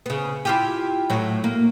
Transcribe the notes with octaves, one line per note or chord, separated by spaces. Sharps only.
C#3 B3
E4 F4 G4
A2 F#3
A#3